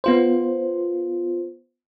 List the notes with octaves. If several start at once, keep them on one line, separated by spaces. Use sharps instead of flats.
B3 F4 C5